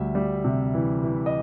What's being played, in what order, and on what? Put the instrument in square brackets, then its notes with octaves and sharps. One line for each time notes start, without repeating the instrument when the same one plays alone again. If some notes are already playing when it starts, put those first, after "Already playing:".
Already playing: [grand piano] D2 G3 E5
G3
C3
E3
E3
D#5